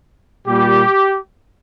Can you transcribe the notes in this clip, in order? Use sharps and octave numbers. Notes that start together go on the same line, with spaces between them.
A#2 G3 G4